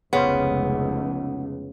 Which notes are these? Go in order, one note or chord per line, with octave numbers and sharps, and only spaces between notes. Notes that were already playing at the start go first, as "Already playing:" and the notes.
F1 C#2 C#3 B3 C#4 C5